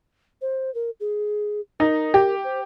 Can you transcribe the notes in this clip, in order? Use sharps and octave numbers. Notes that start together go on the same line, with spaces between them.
C5
A#4
G#4
D#4 A#4
G4
C5